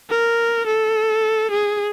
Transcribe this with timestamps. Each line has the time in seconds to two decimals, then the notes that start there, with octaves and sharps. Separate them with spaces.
0.10 A#4
0.66 A4
1.51 G#4